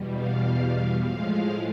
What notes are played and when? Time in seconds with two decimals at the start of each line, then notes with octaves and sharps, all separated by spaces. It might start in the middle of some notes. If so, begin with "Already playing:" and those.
Already playing: E2 B2 G3
0.15 F5
1.03 A2 F3 G#3 F5